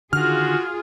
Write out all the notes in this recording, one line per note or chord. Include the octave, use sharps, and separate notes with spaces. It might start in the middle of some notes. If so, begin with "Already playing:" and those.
D3 D#3 F4 F#4 G#4 F6